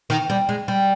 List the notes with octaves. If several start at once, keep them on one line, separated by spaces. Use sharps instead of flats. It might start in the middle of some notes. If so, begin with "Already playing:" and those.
D#3
G3
G#3
G3